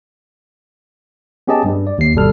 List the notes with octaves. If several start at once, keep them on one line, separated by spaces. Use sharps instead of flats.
B3 C#4 G4 G#4 D#5 A5
G2 G3
D5
D#2 C7
G1 B2 G3 A4 F6